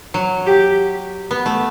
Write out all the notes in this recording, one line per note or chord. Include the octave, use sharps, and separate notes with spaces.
F#3
G4
B3
A3